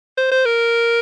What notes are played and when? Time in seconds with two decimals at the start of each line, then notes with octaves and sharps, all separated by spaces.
0.17 C5
0.31 C5
0.45 A#4